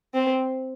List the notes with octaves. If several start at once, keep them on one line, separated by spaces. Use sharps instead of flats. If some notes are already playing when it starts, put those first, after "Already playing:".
C4